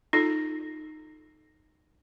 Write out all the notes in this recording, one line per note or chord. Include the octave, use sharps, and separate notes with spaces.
D#4 F4 A4